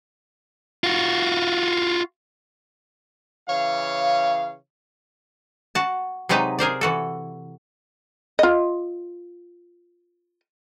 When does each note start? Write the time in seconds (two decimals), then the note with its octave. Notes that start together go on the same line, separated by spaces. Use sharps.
0.84 F4 F#4
3.48 C#3 E3 C#5 F5
5.75 F#4 A5
6.29 C3 F#3 G#3 D#4 B4 A5
6.59 G#4 A#4 C5 D5
6.81 E3 F#4 A4
8.39 F4 D#5